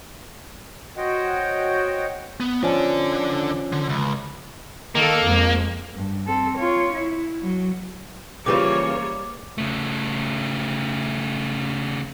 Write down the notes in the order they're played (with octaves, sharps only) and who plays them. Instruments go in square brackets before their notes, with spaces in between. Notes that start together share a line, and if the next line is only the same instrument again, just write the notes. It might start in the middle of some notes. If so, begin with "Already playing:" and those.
[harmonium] F#4 C5 C#5 D#5 F#5 G5
[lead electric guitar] B3
[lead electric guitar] D3 D5 [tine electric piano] F3 C#4
[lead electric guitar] D3
C#2
[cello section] D#3 A4 [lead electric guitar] A#3
[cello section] F2 G#3
[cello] G2
C4 A4
F4 C#5
E4
F#3
[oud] C#3 E3 F3 [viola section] G3 A#3 C#5 [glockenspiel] D6
[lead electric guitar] C#3 A3